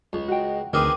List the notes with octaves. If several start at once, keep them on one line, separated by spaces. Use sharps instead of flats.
C#2
F#4 D#5 G5
D2 D#3 C4 G#4 A#4 B4 D6